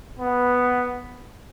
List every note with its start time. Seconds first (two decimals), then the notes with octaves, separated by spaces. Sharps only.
0.20 B3